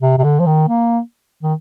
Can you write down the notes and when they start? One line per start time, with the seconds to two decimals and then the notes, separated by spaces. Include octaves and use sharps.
0.01 C3
0.18 C3
0.24 D3
0.40 F3
0.46 D#3
0.69 A#3
1.43 D#3